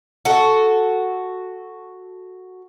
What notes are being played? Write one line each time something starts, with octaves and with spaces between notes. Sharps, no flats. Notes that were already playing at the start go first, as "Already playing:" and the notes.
F#4 A4